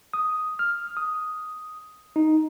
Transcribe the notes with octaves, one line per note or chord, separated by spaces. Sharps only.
D#6
F6
D#6
D#4